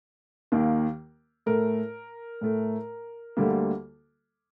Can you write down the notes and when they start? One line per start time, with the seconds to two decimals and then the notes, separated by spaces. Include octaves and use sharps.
0.52 D#2 D#3 A#3
1.46 A2 A3 A#4
2.41 A2 A3
3.37 D2 D3 G3 A#3